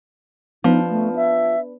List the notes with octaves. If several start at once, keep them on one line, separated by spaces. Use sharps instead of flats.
F3 B3 D4 D#4
A3
E5